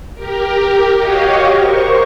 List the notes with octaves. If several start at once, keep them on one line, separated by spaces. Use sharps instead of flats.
G4 A#4
F#4 G4 C#5 D#5 F5
A#4 C5 C#6